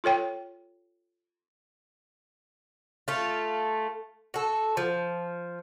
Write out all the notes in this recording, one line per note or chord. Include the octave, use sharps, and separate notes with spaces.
F4 A4 C#5 G5
A3 F4
F#4 A4
F3